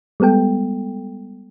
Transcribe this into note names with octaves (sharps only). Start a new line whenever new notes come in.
G3 G#3 B3 A4 G5